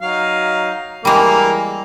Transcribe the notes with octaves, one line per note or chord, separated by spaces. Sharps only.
F#3 D#4 F5
E3 G3 G#3 A#3